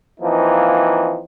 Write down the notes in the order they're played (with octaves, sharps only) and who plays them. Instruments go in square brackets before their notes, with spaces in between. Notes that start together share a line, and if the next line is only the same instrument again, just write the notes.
[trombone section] E3 F3 A#3 C4 D#4